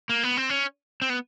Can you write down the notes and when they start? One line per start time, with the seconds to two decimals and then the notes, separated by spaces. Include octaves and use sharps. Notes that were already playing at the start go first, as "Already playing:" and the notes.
0.09 A#3
0.23 B3
0.37 C4
0.50 C#4
1.02 C4
1.10 B3